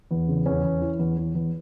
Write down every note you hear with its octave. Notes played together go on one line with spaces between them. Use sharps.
E2
C#3
E2 C#4
E2
E3
E2
E2
E2